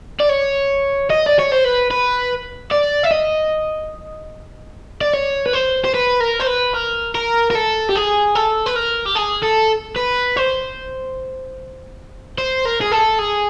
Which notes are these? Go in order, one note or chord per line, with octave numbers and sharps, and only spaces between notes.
D5
C#5
D#5
D5
C#5
C5
B4
B4
D5
E5
D#5
D5
C#5
B4
C5
C5
B4
A#4
C5
B4
A#4
A#4
A#4
A4
G4
G#4
A4
B4
A#4
G4
G#4
A4
B4
C5
C5
A#4
G#4
A4
G#4